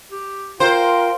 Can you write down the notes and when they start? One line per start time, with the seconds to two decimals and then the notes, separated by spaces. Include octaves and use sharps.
0.12 G4
0.60 F4 A#4 C5 G5